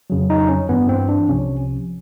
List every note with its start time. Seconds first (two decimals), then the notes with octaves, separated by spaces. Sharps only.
0.10 F2 C#3 F#3
0.30 D#4
0.49 C#4
0.69 G2 E3 B3
0.89 C4
1.09 D4
1.28 C2 C3 F3 C#4